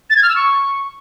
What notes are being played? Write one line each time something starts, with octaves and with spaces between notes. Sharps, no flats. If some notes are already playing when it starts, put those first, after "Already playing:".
A6
G#6
F6
E6
C#6